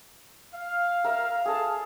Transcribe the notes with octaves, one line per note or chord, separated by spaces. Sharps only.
F5
A#4 E5
G#4 A4 A5